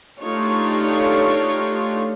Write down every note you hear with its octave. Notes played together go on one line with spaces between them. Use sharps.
A3 D4 D#4 F4 G4 C#5